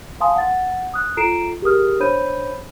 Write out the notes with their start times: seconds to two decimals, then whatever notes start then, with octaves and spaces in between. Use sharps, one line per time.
0.20 F5 G#5 A5 C6 D#6
0.36 F#5 A6
0.94 D#6 F#6
1.17 F4 A4 A#5 C7 D7 E7
1.62 G4 G#4 A#4 D#6 F6
2.00 D4 C5 C#5 B5 G6 D#7